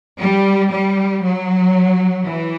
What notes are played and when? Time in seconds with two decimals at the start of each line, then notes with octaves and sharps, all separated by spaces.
0.18 G3
0.70 G3
1.22 F#3
2.25 E3